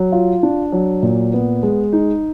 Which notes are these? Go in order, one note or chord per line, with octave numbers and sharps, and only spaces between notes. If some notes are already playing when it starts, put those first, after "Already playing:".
Already playing: F#3
F4
D4
F#3
A#2
B3
G#3
D#4